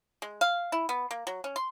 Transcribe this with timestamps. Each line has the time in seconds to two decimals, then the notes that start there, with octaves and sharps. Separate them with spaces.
0.22 G#3
0.41 F5
0.72 E4
0.89 B3
1.11 A#3
1.27 F#3
1.44 C#4
1.56 C6